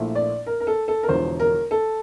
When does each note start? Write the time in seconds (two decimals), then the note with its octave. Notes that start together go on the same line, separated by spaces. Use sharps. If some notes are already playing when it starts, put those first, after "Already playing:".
Already playing: A#1 A#2 A3 E4
0.15 D5
0.47 A#4
0.60 A#4
0.67 A4
0.88 A4
1.03 A#4
1.08 E1 E2 D3 F3 C5
1.40 A#4
1.71 A4